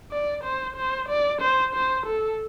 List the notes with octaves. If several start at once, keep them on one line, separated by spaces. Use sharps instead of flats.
D5
C5
C5
D5
C5
C5
A4